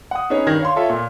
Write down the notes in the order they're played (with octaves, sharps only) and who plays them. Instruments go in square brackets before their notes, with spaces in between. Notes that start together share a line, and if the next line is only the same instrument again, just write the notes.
[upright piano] F#5 D#6
C#4 D#4 G#4 B4 C#5
G2 D#3 G#6 A#6
C#5 F5 C6
F4 A4 C#5 E5
A#2